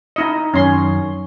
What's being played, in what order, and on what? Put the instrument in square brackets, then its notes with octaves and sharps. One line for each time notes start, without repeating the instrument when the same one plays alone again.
[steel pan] D#4 E4 D#5
[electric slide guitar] F#2 D#3 [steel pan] C#4 C6